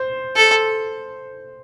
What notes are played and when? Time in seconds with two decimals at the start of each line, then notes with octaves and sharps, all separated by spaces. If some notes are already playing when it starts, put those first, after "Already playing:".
Already playing: C5
0.36 A4